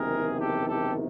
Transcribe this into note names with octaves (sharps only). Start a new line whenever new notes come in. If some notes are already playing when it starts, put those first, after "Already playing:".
Already playing: F#1 E2 C3 D#3 G#4 A#4
G4 A4
G4 A4